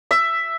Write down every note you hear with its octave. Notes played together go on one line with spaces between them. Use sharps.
E5